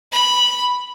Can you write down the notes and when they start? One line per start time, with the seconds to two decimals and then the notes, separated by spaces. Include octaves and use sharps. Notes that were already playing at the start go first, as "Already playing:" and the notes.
0.12 B5